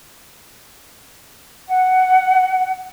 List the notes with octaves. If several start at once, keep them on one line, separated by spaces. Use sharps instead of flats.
F#5